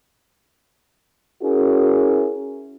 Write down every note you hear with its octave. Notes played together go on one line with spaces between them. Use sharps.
C#4 E4 F#4 G#4 A#4